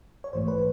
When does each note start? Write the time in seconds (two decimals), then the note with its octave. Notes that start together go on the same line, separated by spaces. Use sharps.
0.24 C#5
0.33 A#1 G#2 E3 A3 C5
0.48 B4